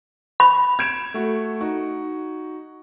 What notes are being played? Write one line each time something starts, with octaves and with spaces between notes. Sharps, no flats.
B5
G#6 D7 E7
A3 F#4
D#4 F#4